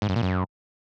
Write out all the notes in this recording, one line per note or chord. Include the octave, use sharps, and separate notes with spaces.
G#2
F#2
A#2
F#2